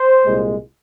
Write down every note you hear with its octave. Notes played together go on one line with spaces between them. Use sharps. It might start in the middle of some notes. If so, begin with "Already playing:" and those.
Already playing: C5
C2 A#2 G#3